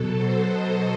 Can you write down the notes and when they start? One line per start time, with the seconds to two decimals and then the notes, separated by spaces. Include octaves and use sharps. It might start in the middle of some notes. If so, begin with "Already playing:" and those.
Already playing: B2 F#3 A4
0.14 C5
0.44 D#5